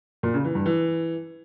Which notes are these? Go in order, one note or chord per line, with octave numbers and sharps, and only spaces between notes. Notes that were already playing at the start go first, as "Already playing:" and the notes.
A#2
C#3
E3
G2
E3